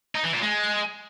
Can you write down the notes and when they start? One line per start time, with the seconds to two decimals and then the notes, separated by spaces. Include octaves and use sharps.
0.15 D#4
0.24 E3
0.33 A#2
0.42 G#3